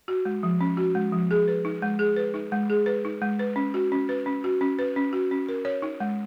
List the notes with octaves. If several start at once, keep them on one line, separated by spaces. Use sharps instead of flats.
F#4
G#3
F3
C#4
F#4
G#3
F3
G#4
B4
D#4
G#3
G#4
B4
D#4
G#3
G#4
B4
D#4
G#3
B4
C#4
F#4
C#4
B4
C#4
F#4
C#4
B4
C#4
F#4
C#4
A#4
C#5
D#4
G#3